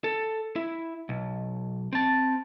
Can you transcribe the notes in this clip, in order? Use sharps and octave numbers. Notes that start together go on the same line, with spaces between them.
A4
E4
B1
C4 A5